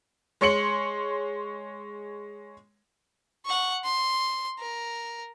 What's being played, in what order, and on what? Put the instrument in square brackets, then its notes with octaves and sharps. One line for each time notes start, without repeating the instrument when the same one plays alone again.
[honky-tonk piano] G#3 C#5 C6 C#7 F#7
[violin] F#5 C#6
C6
A#4